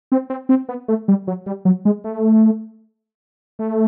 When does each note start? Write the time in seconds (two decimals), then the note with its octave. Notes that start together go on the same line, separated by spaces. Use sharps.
0.12 C4
0.30 C4
0.49 C4
0.69 B3
0.88 A3
1.08 G3
1.27 F#3
1.46 G3
1.65 F#3
1.85 G#3
2.04 A3
3.59 A3